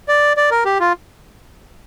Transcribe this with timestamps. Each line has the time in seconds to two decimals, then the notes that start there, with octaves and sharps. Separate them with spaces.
0.08 D5
0.37 D5
0.51 A#4
0.65 G4
0.80 F4